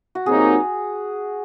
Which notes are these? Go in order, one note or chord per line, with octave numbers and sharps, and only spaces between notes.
F#4
C3 F#3 A#3 D#4 G#4